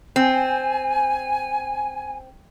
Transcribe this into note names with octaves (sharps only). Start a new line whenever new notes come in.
C4 G#5